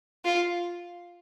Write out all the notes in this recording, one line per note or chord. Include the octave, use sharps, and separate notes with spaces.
F4